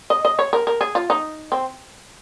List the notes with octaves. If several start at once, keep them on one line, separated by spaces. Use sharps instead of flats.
D#5
D#5
C#5
A#4
A#4
G#4
F4
D#4
C4